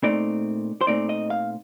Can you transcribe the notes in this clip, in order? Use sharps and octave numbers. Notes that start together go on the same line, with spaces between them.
A#2 A3 C4 D#4 D5
C5
A#2 A3 C4 D#4 D5
D#5
F5